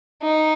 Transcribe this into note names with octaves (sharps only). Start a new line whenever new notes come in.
D#4